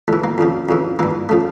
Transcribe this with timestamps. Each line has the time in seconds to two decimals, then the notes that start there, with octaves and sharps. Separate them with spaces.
0.08 E2 E3 A3
0.24 A#3
0.38 F2 C#3 F3
0.69 F2 C#3 E3
0.99 G2 E3 A#3
1.29 C#3 F3 A3